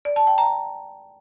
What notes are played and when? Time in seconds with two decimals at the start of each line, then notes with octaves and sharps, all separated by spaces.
0.05 D5
0.16 A5
0.27 G5
0.38 A#5